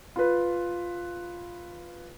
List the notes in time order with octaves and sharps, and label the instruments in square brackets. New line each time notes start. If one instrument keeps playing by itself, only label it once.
[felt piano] F4 B4